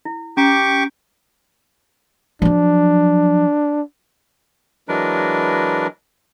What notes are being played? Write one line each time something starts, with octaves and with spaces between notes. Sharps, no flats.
E4
C#4 G4 A#5 C#6 D6
F3 F#3 D4
E3 F#3 G#3 D4 A#4 B4